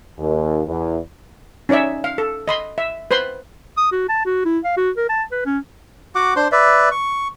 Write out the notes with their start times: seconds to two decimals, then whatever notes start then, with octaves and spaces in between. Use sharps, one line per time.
0.19 D#2
0.67 E2
1.69 C#4 D#4 C#5 D5 E5
2.04 F5
2.18 A4
2.48 D#5 B5 C6
2.78 E5
3.11 B4 C5 B5 C6
3.77 D#6
3.92 F#4
4.09 A5
4.26 F#4
4.45 E4
4.64 F5
4.77 F#4
4.97 A#4
5.09 A5
5.31 B4
5.46 C#4
6.15 F#4 F#5 D6
6.36 D4 C5 C6
6.52 B4 D5 E5
6.91 C#6